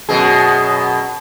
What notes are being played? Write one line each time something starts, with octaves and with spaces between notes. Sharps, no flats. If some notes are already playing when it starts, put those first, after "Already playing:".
F#2 B2 G#4